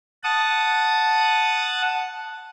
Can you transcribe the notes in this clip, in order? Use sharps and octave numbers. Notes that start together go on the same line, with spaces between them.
F#5 A5 D#6